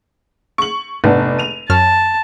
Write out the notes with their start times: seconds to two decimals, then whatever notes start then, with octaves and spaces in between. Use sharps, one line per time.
0.58 C#6 F#7
1.04 F1 G#2 B3 D4
1.39 D#7 F7
1.70 F#2 C#5 A5 F6